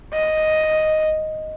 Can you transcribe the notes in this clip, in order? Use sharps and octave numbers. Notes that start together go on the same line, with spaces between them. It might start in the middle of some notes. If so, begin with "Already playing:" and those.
D#5